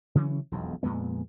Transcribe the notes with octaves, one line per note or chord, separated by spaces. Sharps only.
C#3 E3 F#3 C#4
E1 B1 F2
F2 A#2 G#3 B3